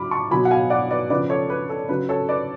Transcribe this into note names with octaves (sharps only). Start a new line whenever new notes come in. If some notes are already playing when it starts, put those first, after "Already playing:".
Already playing: C#3 F#3 B5 D6 F6
A5 C#6
B2 F#3 G#5 B5
F#5
F5 G#5
D5 F#5
B4 D5
C#3 F3 B4 D5
A4 C#5
B4
A4
C#3 F#3 B4
A4 C#5
B4 D5